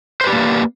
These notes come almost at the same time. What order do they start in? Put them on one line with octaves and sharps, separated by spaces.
C5 B4 G4 D5 A#3